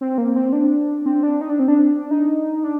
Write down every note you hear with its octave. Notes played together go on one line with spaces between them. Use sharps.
C4
A#3
C4
D4
C4
D4
D#4
D4
C4
D4
D#4
D4